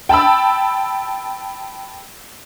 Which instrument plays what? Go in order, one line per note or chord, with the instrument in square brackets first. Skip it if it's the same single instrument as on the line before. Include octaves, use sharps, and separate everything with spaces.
[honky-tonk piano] G5 A5 B5 E6